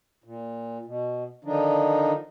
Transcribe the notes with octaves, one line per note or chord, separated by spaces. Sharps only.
A#2
B2
D3 D#3 F3 D4 D#4